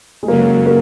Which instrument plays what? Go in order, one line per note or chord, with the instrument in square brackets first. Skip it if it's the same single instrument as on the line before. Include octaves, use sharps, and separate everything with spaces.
[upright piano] G#3
[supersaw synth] F#2 C#3 F#3 [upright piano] A#3
[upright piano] A#3